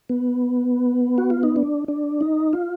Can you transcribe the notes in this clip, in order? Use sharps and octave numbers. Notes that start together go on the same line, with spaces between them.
B3
F#4
F4
D#4
D4
D4
D#4
F4